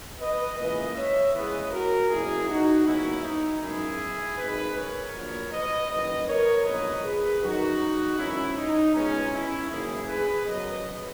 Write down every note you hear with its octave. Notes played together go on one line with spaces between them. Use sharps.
B4 D#5
C#2 C#3 E3 A#3 B4 D#5
C#5 E5
E2 C#3 E3 G#3 B3 B4 D#5
F#4 A#4
F#1 E2 B2 E4 G#4
D#4 F#4
D#2 C#3 F#3 B3 C#4 E4
D#4
F#2 C#3 G#3 B3 E4 G#4
G#1 F#2 D#3 G#4 B4
A#4 C#5
A#1 A#2 F#3 B3
B4 D#5
F#1 F#2 D#3 B4 D#5
A#4 C#5
A#1 G#2 F#3 B3 B4 D#5
G#4 B4
F#2 D#3 F#3 D#4 F#4
G#1 F#2 E3 C#4 E4
D#4
C#2 B2 G#3 B3 C#4
C#4 E4
F#1 F#2 D#3 A#3 E4 G#4
G#4 B4
F#2 C#3 F#3 B3 B4 D#5